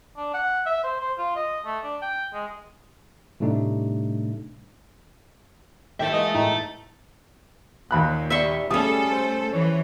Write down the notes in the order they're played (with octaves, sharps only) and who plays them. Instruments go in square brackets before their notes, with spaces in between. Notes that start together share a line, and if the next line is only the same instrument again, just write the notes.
[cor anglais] D4
F#5
E5
C5
C5
F4
D#5
A3
D4
G5
G#3
[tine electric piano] A2 C3 G3 A3 D4 D#4
[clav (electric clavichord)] A2 D#3 G4 [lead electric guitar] A4 E5 [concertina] G5
[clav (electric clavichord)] E3 G#3 A#3 [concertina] D#5
[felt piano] A2 G5 [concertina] D#4
[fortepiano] D#2 B5 F#6 [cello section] A#2
[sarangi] G3 [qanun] E5 C6 C#6
[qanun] G3 C#4 [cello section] A3 A4 [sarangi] G#4 [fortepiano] D#6
[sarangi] C5
[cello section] E3 [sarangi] C#5